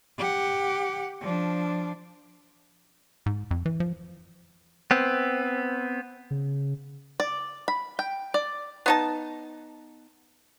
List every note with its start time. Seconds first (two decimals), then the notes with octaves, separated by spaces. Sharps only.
0.17 G4 F#5
1.21 F3 D4
3.26 G#2
3.51 F2
3.66 E3
3.80 F3
4.91 B3 C4
6.31 C#3
7.20 D5
7.68 B5
7.99 G5
8.34 D5
8.86 B3 D#4 A5